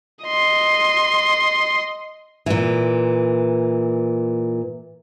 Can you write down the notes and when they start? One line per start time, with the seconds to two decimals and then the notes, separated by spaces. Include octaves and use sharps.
0.24 D#5 C6
2.46 A#2 E3